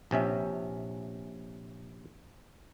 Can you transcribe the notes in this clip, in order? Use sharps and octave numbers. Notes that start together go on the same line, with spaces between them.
A#1 C3 C#4 E5